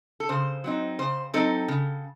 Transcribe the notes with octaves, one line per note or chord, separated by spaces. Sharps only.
A4
C#3 C5
F#3 C4 D#4
C#3 C5
F#3 C4 D#4 A4
C#3